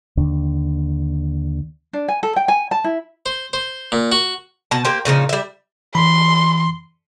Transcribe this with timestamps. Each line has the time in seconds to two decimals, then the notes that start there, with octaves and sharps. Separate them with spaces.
0.17 D#2 D3
1.93 D4
2.08 G#5
2.23 A4
2.36 G5
2.48 G#5
2.71 A5
2.84 E4
3.26 C5
3.53 C5
3.92 A#2
4.12 F#4
4.71 B2 A5
4.85 A#3 G4 C5
5.05 A#2 C#3 F3 D#4
5.29 G3 E5
5.95 E3 B5 C6